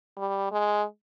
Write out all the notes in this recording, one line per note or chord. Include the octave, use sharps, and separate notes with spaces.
G3
G#3